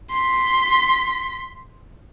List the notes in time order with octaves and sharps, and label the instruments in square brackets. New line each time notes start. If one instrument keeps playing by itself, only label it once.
[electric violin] C6 B6